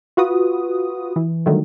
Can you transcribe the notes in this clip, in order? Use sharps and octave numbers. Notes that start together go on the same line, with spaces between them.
F4 F#4 B4 D#6
E3
D3 D#3 F#3 G3 A3